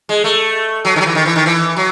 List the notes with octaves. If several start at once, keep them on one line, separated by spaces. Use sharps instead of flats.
G#3
A3
F#3
D#3
F#3
E3
D#3
E3
D#3
E3
F#3